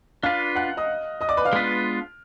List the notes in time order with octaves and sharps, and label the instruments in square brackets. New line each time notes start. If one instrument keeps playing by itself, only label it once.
[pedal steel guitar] D4 F4 B4 D5 [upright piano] F5 F6
[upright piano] F#5 F#6
D#5 D#6
D#5 D#6
D5 D6
B4 B5
F5 F6
[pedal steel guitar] G#3 B3 D4 F4 B4